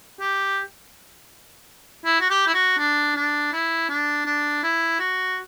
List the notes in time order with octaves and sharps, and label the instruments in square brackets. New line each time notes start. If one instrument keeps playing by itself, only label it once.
[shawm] G4
E4
F#4
G4
E4
F#4
D4
D4
E4
D4
D4
E4
F#4